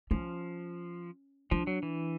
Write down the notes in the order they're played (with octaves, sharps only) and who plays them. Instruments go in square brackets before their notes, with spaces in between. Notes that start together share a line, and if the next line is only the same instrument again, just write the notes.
[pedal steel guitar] F3 [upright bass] C#4
[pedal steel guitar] F3 [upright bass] D4
[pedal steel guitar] F#3
E3